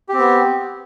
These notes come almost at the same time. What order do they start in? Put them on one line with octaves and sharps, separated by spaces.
G4 C4 B3